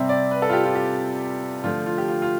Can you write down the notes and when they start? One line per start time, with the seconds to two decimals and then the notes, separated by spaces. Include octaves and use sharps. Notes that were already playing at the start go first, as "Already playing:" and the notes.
Already playing: C3 G3 C4 E5
0.09 D5
0.31 B4
0.42 A4
0.49 F4
0.53 G4
0.65 F4
0.75 G4
1.64 D3 F3 A3 F4
1.86 F4
1.98 G4
2.08 F4
2.22 F4